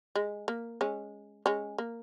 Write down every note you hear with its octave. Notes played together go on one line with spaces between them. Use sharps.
G#3
A#3
G#3 C#4
G#3 C#4
A#3